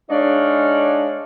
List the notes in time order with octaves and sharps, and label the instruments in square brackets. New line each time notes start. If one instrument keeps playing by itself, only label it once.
[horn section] G#3 D4 D#4 C#5 F5